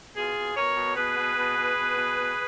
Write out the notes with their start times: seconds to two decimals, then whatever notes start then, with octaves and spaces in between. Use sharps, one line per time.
0.16 B2 F4 G#4
0.36 B2
0.56 B2 A#4 C#5
0.76 B2
0.96 B2 G#4 B4
1.17 B2
1.37 B2
1.57 B2
1.77 B2
1.96 B2
2.17 B2